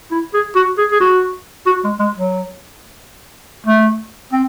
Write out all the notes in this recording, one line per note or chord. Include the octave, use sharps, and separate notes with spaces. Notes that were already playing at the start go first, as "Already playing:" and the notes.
E4
G#4
F#4
G#4
G#4
F#4
F#4
G#3
G#3
F#3
A3
C4